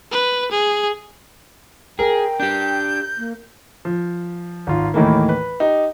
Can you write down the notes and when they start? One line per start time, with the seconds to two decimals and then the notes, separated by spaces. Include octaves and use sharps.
0.12 B4
0.52 G#4
1.99 G#4 A#4 G5
2.40 D4 G4 G6
3.17 A#3
3.85 F3
4.67 G#1 F4
4.94 D#2 A2 D#3 E3 A3 A#3
5.29 B4
5.60 D#4 G4